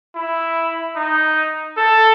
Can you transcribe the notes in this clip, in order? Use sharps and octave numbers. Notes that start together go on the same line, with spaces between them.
E4
D#4
A4